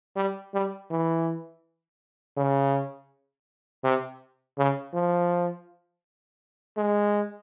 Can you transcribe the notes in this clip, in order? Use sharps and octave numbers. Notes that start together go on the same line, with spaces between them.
G3
G3
E3
C#3
C3
C#3
F3
G#3